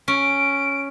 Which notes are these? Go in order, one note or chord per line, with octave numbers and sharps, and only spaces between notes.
C#4 D7